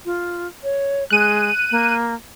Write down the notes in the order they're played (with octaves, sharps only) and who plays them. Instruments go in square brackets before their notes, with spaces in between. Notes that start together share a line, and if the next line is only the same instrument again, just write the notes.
[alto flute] F4
C#5
[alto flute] G#3 [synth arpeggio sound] F#6 D#7
[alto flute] A#3